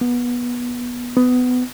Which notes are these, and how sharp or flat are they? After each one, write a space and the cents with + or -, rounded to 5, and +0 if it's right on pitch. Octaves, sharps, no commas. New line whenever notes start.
B3 -20
B3 +20